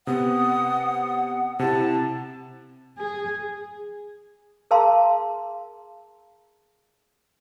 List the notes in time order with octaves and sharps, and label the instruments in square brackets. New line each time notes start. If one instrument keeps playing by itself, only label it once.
[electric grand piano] C3 B3 [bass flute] F#5 [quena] D#6
[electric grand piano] C3 E4 [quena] A5
[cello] G#4
[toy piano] G#4 A#4 F5 A5 A#5 C6